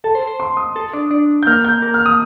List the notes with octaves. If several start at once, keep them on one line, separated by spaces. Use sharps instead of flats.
A4 A5
C5
C5
C6
D#6
A4
D4
D4
G6
A#3 F6
G6
A#3
F6
D#6